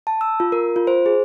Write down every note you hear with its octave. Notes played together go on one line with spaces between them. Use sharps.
A5
E6
F4
A#4
F4
C5
G#4